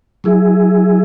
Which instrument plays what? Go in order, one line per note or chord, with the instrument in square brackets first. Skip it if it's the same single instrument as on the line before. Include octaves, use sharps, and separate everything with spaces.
[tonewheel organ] F#3 E4 G#4